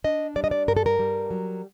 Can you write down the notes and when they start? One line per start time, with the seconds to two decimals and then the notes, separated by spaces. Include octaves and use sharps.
0.04 D4 D#5
0.36 G3 D5
0.44 D#5
0.51 D5
0.68 G2 A#4
0.77 A4
0.86 A#4
0.99 G3
1.31 F#3